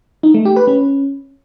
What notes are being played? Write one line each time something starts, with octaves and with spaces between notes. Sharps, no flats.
D#4
A3
G4
B4
C#4